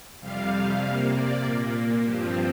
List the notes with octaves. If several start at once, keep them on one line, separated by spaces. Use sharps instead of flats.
F2 C3 G3 F5
C3 A#3 F5
D5
A#2 A#3
G2 F3 C4 G4